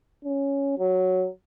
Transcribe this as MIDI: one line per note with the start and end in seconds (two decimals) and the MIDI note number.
0.24 0.75 61
0.78 1.28 54